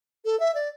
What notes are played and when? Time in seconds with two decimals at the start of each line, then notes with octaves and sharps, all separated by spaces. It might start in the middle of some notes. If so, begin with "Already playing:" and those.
0.25 A4
0.40 E5
0.55 D5